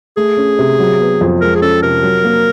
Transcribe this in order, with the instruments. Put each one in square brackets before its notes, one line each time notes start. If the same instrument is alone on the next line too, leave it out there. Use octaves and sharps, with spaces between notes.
[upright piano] A3 [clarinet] G#4
[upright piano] C#4
C3
F#3
B3
F2
[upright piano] G#3 [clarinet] A#4
[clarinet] G#4
[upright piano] C#4 [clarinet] A4
[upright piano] C3 [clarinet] A#4
[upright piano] F#3
A#3